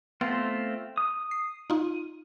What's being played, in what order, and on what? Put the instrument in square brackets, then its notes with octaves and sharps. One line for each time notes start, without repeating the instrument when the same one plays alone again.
[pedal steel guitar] A3 C4 F4 [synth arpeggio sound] B3
[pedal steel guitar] D#6
[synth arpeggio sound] C7
D#4 F4